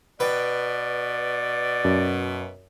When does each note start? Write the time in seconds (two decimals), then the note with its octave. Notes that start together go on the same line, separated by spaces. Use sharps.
0.20 B2 B4 D5 G5
1.85 F#2